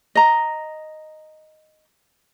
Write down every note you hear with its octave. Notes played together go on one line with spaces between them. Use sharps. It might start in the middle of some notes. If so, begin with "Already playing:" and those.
D#5 A#5